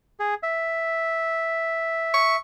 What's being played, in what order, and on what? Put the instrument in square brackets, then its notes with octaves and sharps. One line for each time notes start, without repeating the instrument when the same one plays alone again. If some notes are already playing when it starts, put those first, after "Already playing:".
[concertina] G#4
E5
[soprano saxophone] C#6